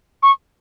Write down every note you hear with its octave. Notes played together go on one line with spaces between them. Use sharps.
C#6